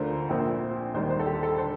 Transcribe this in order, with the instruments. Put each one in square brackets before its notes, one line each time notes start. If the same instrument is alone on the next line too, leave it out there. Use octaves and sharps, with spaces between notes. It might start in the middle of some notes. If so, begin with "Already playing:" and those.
Already playing: [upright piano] D2 D3 A3 D4 F4 A#4 C5
A#1 A#2 F3 C4
D#2 D#3 G3 C5
C5
A4
G4
A4
D3 C5